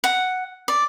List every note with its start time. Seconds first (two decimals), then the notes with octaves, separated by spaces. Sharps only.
0.04 F#5
0.68 D5